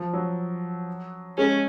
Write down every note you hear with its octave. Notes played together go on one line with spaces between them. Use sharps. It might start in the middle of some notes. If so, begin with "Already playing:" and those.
Already playing: F3
F#3
G#3 C#4